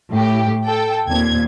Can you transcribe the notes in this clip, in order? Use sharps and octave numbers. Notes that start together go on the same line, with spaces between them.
A2 G4
A4 G5
D#2 A#2 C4 G#6